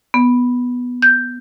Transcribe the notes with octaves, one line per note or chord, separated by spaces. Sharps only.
B3
G6